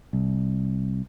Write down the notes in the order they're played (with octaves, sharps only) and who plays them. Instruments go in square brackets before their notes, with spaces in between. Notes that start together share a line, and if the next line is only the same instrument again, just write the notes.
[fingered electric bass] C2